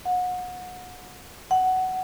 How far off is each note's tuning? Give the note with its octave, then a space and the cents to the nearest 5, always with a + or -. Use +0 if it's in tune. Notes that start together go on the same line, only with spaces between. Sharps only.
F#5 -30
F#5 +15